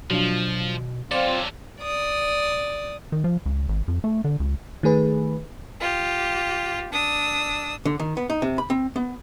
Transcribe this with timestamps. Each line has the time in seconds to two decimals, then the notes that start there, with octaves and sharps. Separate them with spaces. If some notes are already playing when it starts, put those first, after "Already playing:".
0.10 B2 F3 F#3 D4 F4
1.11 F#3 C4 F4 A4 D5 D6
1.81 D5 D#6
3.12 D#3
3.24 F3
3.46 C#2
3.69 G#1
3.88 F2
4.04 A3
4.24 D3
4.40 C#2
4.83 D#3 A3 G#4 B4
5.80 F4 G4
6.91 D4 D#6 E6
7.85 D3
8.00 D#3
8.17 B3
8.30 D#4
8.42 C3
8.58 B5
8.70 C4
8.96 B3